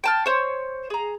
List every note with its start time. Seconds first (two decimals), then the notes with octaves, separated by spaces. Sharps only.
0.04 G5 A5 F6
0.26 C5 C#5
0.90 G#4 A#5